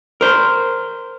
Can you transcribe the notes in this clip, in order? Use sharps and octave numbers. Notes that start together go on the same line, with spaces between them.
A#4 C5